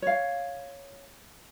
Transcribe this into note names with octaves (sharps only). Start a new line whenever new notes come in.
C#5 F5